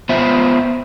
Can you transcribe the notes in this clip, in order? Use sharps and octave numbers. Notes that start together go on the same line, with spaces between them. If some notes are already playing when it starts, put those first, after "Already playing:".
B3 F4 C5 E5